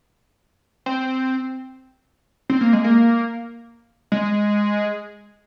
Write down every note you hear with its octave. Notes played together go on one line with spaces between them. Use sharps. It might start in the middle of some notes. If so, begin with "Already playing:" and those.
C4
C4
A#3
G#3
A#3
G#3